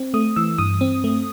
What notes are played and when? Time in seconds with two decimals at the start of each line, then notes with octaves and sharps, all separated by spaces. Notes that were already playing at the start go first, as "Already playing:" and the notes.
Already playing: C4
0.14 A3 D#6
0.36 E3 E6
0.58 G2 D#6
0.81 C4
1.04 A3